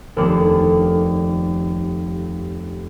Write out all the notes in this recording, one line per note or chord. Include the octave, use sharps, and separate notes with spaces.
F1 D#2 B3 A4 D5 D6